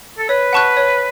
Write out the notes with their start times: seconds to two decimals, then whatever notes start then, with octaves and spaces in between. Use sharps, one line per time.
0.18 A4
0.29 B4 C#5
0.53 F#5 A5 C#6 F#6
0.77 C#5